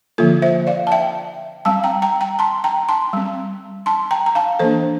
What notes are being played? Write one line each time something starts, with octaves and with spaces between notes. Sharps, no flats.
D3 F3 A#3 F4 A4
C5 E5
D5 F5
A5
E5 G5
G3 C4 F5 A5
G5 A#5
G5 A#5
G5 A#5
A5 C6
G5 A#5
A5 C6
G3 C4
A5 C6
G5 A#5
A#5
F5 A5
E3 A#3 D4 A4 C5